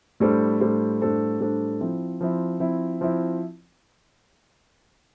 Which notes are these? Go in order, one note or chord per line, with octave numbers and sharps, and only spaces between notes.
A2 G3 D4 A4 C5
A2 G3 D4 A4 C5
A2 G3 D4 A4 C5
A2 G3 D4 A4 C5
F3 C4 E4
F3 C4 E4
F3 C4 E4
F3 C4 E4